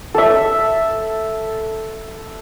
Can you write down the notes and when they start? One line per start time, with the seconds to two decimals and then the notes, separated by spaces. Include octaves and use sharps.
0.14 A4 E5